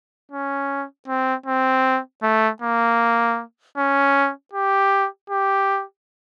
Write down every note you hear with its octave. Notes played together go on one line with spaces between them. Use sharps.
C#4
C4
C4
A3
A#3
C#4
G4
G4